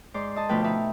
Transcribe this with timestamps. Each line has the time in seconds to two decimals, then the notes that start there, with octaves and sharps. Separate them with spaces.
0.14 G#2 C5 D5 C6
0.36 D#5 A5
0.49 D2 B2 F3 A3 B4 G5
0.64 D#4 B4 E5